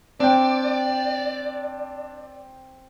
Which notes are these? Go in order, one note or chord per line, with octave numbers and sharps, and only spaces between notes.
C4 D4 D5 G5